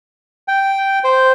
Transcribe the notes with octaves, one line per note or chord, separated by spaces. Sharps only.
G5
C5